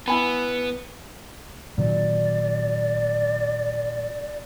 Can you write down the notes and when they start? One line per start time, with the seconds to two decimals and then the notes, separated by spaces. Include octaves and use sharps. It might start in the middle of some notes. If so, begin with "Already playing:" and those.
0.08 B3 E4 G#5 B5
1.78 A#2 D#3 F#3 D5